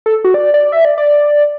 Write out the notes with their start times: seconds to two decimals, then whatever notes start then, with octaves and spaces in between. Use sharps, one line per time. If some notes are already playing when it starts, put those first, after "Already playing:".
0.06 A4
0.24 F#4
0.34 D5
0.54 D5
0.72 E5
0.85 D5
0.98 D5